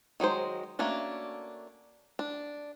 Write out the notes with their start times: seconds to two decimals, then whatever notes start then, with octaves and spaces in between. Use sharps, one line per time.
0.20 D#3 F#3 G#3 C5
0.79 A3 A#3 C#4 D4 F#4
2.19 D4